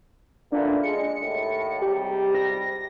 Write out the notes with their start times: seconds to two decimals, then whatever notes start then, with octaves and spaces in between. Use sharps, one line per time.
0.52 A#2 D3 E3 D4
0.83 G#3 C#7
1.20 D#2 A2
1.82 G#2 C3 G3 G4
2.35 A#6